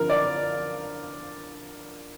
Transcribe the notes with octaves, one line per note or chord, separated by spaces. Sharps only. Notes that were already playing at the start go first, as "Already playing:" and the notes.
Already playing: D3 F3 A#4
D5